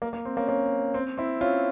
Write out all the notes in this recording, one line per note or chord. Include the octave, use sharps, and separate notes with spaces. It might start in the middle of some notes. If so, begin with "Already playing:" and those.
A#3
A#3
C4
A#3 C#4
A#3 C#4
C4
C4 E4
C#4 F4